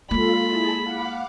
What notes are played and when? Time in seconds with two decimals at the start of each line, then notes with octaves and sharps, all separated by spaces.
0.11 G#3 A#3 F4 A4 B5 C6
0.46 E4 G#4 A5
0.82 F5 F#5 D6